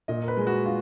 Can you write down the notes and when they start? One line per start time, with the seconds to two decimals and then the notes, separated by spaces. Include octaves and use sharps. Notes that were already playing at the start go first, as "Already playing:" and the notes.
0.08 A#2 D#5
0.23 A#4
0.28 B4
0.37 G#3
0.47 F#4
0.66 F4